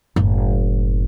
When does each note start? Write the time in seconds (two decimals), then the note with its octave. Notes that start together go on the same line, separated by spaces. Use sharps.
0.16 F#1 A2